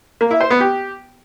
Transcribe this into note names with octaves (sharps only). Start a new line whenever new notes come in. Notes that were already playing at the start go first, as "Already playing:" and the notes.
A#3
E4
C5
B3
G4